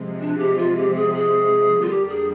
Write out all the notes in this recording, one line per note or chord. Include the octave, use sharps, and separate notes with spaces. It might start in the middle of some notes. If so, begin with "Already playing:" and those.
Already playing: C3 F3 G#3
D4
G4
F4
G4
G#4
G#4
F4
F2 D3 G3 A#3 D4 G4
G#4